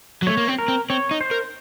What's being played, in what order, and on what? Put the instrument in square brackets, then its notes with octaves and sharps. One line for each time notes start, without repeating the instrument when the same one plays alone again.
[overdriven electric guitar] F#3
[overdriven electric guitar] A3 [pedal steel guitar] C#5
[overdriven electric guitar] A#3
C4
[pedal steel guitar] A#4
[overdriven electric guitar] C4
[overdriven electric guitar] C4 [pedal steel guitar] C#5
[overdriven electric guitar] D#4
[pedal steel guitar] C5
[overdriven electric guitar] A#4